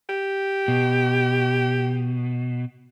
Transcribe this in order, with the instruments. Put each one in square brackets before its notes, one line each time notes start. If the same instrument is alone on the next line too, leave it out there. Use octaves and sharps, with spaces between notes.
[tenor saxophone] G4
[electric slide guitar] B2